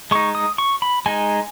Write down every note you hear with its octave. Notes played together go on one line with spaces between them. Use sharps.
G#3 D#4 C#6
D#6
C#6
B5
G#3 D#4 G#5